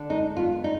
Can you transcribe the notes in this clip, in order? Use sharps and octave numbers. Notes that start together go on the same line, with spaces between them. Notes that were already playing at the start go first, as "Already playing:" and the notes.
Already playing: D3
G#3 D#4
B3 F4
D#4